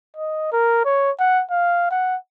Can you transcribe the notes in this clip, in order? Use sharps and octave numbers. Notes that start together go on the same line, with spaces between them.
D#5
A#4
C#5
F#5
F5
F#5